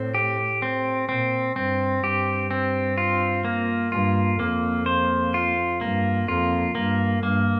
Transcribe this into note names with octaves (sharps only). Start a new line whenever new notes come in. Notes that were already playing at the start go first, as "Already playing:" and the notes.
Already playing: A2 C4
G4
C4
A#2 C4
G2 C4
G2 G4
C4
F4
A#3
G2 F4
F2 A#3
C5
F4
G2 A#3
F2 F4
G2 A#3
G2 A#3